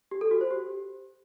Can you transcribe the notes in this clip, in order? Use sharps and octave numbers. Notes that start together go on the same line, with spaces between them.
G4
A4
F#4
C5
G4